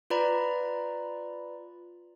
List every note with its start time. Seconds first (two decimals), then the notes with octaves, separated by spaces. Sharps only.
0.10 F4 B4 D5 A#5 B5